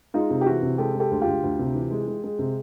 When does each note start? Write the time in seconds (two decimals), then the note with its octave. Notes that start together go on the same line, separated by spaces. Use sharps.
0.14 G#3 D#4 F4
0.30 C3
0.41 G4
0.46 E3 E4 F#4
0.62 C3
0.78 G#3 G4 A4
0.94 G#3
1.00 G4 A4
1.11 D2
1.21 F4 G4
1.27 D2
1.43 D2
1.59 C3
1.75 E3
1.91 G#3
2.07 G#3
2.24 G#3
2.39 C3